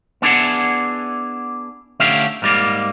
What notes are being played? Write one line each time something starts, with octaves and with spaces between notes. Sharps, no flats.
B3 D4 E4 G#4 F#5
D3 A3 C#4 E4 G4 F5
G#2 G3 A#3